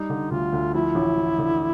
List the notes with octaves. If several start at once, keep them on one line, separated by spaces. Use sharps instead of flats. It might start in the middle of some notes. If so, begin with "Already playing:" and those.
Already playing: G3 D#4
D3
D2 F4
D2
F3 E4
A1
F3
D3